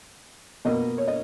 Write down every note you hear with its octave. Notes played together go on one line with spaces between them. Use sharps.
B2 A#3 D#5
C#5
D#5